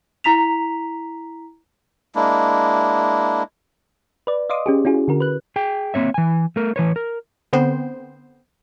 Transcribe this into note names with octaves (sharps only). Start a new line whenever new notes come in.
E4 A#5 B6 F7
G#3 A#3 D4 E4
B4 D5
D5 D#5 F5 C6 D6 D#6
C#4 G4 G#4
C#4 E4 F#4 G#4
D3 F#4 A#4
B4 F#6
G#4 G5
A#3 C4 C#5 E5
E3 G#5
A3 A#4
E3 B4 C#5
A#4
D3 B3 C4 C5